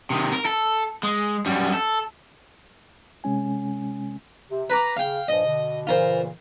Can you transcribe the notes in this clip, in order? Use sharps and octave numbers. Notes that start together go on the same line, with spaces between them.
C3 D#3
A#4
A4
G#3
F#2 G3
A4
C3 G#3 C#4 G#5
C3
B4 A#5 D6
C#3 F5 G5
G2 A#2 F3 D#5
B2 D3
A#2 C#3 E3 F4 A#4 C5